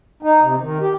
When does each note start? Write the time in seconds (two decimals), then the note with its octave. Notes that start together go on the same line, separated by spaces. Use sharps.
0.23 D#4
0.42 C3
0.60 D#3
0.80 G4